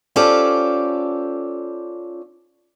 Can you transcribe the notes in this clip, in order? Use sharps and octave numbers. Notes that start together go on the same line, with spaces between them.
C#4 F4 G4 A4 C5 D5